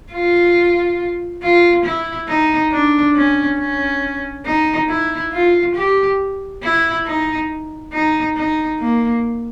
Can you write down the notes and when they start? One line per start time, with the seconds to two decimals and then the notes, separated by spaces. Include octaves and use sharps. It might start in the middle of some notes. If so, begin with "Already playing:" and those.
0.12 F4
1.43 F4
1.85 E4
2.28 D#4
2.72 D4
3.15 C#4
3.59 C#4
4.46 D#4
4.89 E4
5.33 F4
5.75 G4
6.63 E4
7.06 D#4
7.93 D#4
8.36 D#4
8.80 A#3